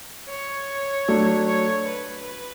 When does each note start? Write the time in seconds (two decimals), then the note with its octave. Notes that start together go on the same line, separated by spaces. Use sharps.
0.28 C#5
1.08 F#3 A3 D4
1.47 C#5
1.88 B4